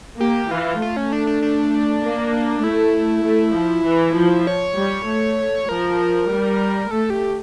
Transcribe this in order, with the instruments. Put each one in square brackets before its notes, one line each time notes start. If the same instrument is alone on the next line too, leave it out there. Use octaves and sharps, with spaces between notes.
[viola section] A#3 [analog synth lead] G4
[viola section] E3 [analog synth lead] F4
[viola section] A3 [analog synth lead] F4
[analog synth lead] C#4
D4
D4
D4
[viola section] A#3
[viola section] A3 [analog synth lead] E4
[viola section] A3
F3
E3
F3
[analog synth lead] C#5
[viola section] G3
A3
[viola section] F3 [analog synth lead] A#4
[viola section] G3
[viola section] A3 [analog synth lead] A4
[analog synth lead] G4